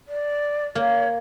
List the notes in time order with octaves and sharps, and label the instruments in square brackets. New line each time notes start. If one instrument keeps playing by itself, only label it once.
[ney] D5
[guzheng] A#3 [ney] C#5